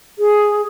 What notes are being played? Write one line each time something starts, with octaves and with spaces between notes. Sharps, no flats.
G#4